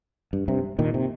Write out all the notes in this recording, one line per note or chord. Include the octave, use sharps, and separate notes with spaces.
G2
G2 C3
A#2 D#3
C3